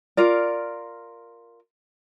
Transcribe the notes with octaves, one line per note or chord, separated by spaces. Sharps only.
F4 A#4 D5